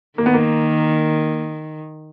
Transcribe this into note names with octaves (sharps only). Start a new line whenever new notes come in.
D#3 A#3
B3
A#3